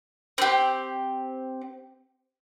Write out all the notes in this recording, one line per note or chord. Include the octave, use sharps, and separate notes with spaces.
C4 G4